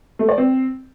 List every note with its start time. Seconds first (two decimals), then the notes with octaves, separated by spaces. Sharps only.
0.19 A3
0.29 D5
0.38 C4